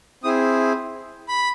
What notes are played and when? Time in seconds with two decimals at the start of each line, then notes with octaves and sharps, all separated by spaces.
0.24 C4 E4 G#4 D#6
1.28 B5